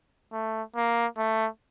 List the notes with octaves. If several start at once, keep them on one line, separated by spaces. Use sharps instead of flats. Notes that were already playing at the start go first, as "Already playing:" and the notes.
A3
A#3
A3